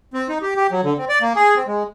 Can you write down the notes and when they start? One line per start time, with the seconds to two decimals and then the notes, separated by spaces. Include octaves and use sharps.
0.14 C4
0.29 D#4
0.42 G4
0.56 G4
0.71 F#3
0.84 D3
0.98 C4
1.09 D5
1.21 A#3
1.36 G#4
1.56 C4
1.67 G#3